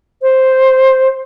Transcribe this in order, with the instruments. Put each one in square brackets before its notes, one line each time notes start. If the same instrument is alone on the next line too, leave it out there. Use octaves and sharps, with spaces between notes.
[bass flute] C5